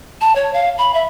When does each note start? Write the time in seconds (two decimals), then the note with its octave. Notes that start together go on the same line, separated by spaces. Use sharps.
0.21 A5
0.36 C#5
0.54 F5
0.78 B5
0.94 E5